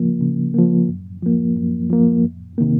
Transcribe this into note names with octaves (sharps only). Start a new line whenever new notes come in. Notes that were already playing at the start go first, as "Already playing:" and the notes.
Already playing: C#3 F3 A#3
C#3
F3 A#3
F#2
F3 A#3
F#2
F3 A#3
F2
C3 D#3 A#3